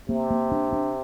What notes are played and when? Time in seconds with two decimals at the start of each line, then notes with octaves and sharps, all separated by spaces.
0.09 C3 A#3
0.30 A#3
0.52 D4
0.73 D4